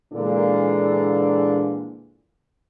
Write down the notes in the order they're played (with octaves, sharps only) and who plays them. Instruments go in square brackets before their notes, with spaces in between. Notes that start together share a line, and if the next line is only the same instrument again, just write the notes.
[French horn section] A#2 D3 E3 G#3 A#3 D4